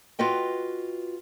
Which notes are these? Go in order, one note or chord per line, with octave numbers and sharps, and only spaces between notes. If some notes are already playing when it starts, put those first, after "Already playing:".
F4 F#4 B4 D#5 G5